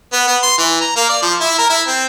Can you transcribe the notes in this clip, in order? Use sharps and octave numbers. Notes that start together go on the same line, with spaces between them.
B3
B3
C6
E3
A#5
A#3
D5
F3
E4
A#4
E4
C4